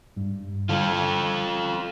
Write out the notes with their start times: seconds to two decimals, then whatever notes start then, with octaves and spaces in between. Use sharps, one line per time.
0.17 G2 G3
0.69 D3 G3 F4 A4